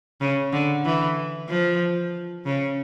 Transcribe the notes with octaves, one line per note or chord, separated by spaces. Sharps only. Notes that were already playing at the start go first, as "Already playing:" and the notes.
C#3
D3
E3
F3
C#3